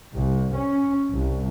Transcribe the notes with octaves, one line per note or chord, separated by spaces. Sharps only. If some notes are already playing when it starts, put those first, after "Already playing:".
C2
C#4
C2